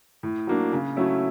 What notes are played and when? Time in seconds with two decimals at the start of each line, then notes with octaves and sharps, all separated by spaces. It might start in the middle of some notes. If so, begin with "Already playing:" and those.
0.23 A2
0.47 F#3 A#3 D4
0.72 C#3
0.97 F#3 A3 C#4 E4